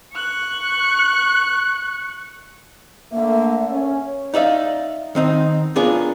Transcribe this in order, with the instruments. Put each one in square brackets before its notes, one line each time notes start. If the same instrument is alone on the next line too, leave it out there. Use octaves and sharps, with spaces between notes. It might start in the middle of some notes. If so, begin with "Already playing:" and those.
[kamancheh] C#6 F#6
[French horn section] D3 A3 A#3 [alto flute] E5
[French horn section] C#4
[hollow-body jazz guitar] D#4 D5 E5 F5
D#3 C4 D#4
B3 D4 F4 G#4 A#4 C#5